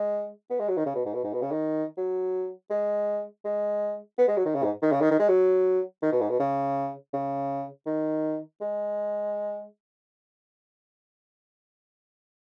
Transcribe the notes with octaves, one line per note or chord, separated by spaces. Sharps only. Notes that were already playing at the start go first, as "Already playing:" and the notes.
Already playing: G#3
B3
G#3
F#3
D#3
C#3
B2
G#2
B2
G#2
B2
C#3
D#3
F#3
G#3
G#3
B3
G#3
F#3
D#3
C#3
G#2
D#3
C#3
D#3
D#3
G#3
F#3
D#3
B2
G#2
B2
C#3
C#3
D#3
G#3